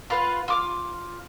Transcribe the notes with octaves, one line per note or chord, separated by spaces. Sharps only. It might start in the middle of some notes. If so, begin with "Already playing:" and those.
F4 B4 F#5
F4 D6 F6